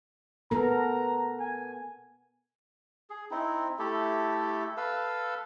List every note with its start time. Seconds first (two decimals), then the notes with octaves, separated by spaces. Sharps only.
0.51 B3 A4 A#4 A#5
1.40 G#5
3.10 G#4
3.31 C4 D#4 E4
3.79 A3 E4 G4 A4
4.77 A4 B4 F5 E6